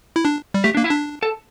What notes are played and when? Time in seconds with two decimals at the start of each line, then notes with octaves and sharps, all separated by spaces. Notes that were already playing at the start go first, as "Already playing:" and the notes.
0.16 E4
0.25 D4
0.54 G3
0.64 A3 G4
0.75 A#3 D4
0.84 E4
0.90 D4
1.23 A4